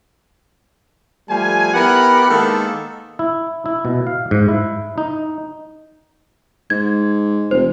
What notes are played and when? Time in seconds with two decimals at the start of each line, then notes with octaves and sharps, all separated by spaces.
1.29 F3 G3 A3 G#5
1.74 B3 E4 G4 A#4 F#5 B5
2.28 D#3 G#3 A#3 B3 A4
3.19 E4
3.66 E4
3.85 B2
4.07 F5
4.31 G#2
4.48 E4
4.98 D#4
6.70 G#2 G#6
7.51 F1 C5